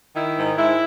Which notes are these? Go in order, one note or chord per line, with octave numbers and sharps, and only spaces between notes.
D#3 E4
G#2
G#2 E4